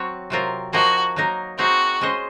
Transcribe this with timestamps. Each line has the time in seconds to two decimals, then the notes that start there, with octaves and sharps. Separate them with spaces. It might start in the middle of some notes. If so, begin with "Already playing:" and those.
Already playing: F#3 C4 F#4 C#5
0.30 C3 F#3 C4 F4 A#4
0.73 F3 A#3 D#4 F#4 A#4 D#5
1.16 F#3 A#3 D#4 A#4
1.58 C4 D#4 F#4 G#4
2.01 G#3 C#4 G#4 C5 D#5